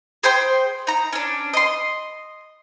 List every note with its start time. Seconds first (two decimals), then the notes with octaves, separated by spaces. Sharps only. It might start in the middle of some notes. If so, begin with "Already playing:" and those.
0.23 G#4 C5 G5 C6
0.87 D#4 A#5
1.13 C#4 D4
1.54 D#5 C6